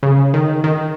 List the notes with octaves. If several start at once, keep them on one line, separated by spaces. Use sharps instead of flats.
C#3
D#3
D#3